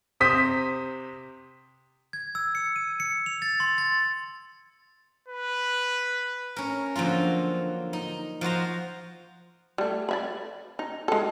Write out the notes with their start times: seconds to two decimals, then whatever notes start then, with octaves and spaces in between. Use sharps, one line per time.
0.20 C3 C5 D#6 B6
2.13 G#6
2.35 E6
2.55 C#7
2.76 D#7
3.00 C#7
3.26 F7
3.42 A6
3.60 C6
3.78 A6
5.28 B4
6.56 C#4 A#4
6.95 D3 F3 F#3 A#3 F4
7.93 D#4
8.41 F3 F#4 C5 A#5
9.78 G3 A3
10.09 D5 E5 B5
10.79 D#4
11.08 G#3 A4